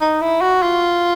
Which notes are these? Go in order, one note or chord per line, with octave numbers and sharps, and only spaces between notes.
D#4
E4
F#4
F4